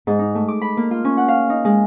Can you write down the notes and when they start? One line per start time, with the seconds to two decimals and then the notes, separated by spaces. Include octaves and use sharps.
0.07 G#2
0.19 D#4
0.35 A3
0.48 D6
0.62 B5
0.77 A#3
0.91 F4
1.05 C#4
1.17 F#5
1.28 F5
1.50 D#4
1.65 G#3